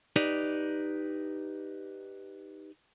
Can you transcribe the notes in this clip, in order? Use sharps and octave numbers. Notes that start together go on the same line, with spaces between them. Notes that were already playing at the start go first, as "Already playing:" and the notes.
D#4 G4 B4 D5